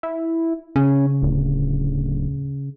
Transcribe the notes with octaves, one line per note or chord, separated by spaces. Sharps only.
E4
C#3 C#4
D1